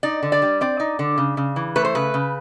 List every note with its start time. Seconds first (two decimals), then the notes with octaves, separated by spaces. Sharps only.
0.03 D#4 D5
0.23 D3
0.32 D5
0.42 G3
0.61 C4 D5
0.80 D#4
0.99 D3
1.18 C#3
1.37 C#3
1.56 E3
1.76 A3 B4
1.85 C5
1.95 C#3 B4
2.14 C#3